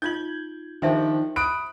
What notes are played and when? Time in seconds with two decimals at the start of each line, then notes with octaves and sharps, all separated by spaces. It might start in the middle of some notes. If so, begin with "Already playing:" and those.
0.02 D#4 F4 G6 G#6 F#7
0.82 D#3 F3 D4 G4 C5 E5 G5
1.36 B5 D#6 F#6 D7